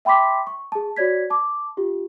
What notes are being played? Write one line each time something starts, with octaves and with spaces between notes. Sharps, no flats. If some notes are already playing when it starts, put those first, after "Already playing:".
E5 G5 B5 C6 D6 B6
C#6
G#4 A5
F#4 C#5 D5 G#6 B6
A5 D6
F4 G4